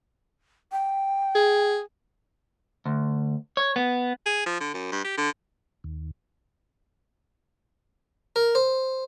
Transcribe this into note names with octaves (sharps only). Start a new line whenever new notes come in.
G5
G#4
D2
C#5
B3
G#4
F3
D3
F#2
G2
G4
D3
D#2
A#4
C5